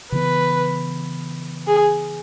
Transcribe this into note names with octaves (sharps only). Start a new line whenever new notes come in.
C#3 E3 B3 B4
G#4